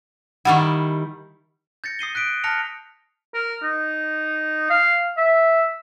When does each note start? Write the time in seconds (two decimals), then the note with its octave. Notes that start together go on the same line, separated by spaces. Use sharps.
0.45 D#3 G3 E4 F#5 C#6
1.84 G6 A6 A#6 C#7
1.99 D#6 C7 D#7 G7
2.15 F#6 B6 D7
2.44 A5 F6 F#6 A#6 C#7 F7
3.34 A#4
3.63 D#4
4.70 F5
5.18 E5